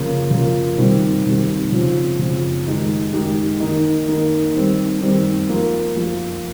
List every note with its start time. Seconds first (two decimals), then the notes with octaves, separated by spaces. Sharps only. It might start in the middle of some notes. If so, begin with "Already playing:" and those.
Already playing: C#3 F3 A#3 F4
0.31 C#3 F3 A#3 F4
0.78 C3 D#3 G3 C4 G4
1.25 C3 D#3 G3 C4 G4
1.72 C#3 F3 C4
2.19 C#3 F3 C4
2.66 D#3 G#3 D#4 G4
3.13 D#3 G#3 D#4 G4
3.60 D#3 A#3 D#4
4.08 D#3 A#3 D#4
4.54 D#3 G3 C4
5.01 D#3 G3 C4
5.49 F3 A#3 F4
5.96 F3 A#3 F4